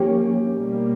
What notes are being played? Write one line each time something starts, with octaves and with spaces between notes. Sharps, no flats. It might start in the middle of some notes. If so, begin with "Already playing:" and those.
Already playing: F3 A#3 C#4 G4
B2 G3 A#3